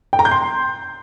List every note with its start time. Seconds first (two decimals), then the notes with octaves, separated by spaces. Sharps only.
0.13 G5
0.19 A#5
0.25 G6
0.31 C6